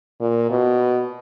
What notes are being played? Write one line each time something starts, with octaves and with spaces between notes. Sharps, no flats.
A#2
B2